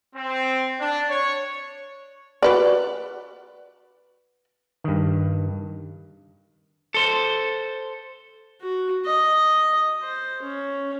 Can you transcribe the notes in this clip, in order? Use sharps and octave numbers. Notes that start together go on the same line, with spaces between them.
C4
D4
C#5
F#4 B4 D5
G2 D#3
A4 C5
F#4
D#5
C5
C#4